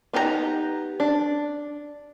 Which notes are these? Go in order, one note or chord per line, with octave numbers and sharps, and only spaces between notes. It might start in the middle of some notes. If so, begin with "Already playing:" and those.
B3 D#4 G4 D#5 A#5
D4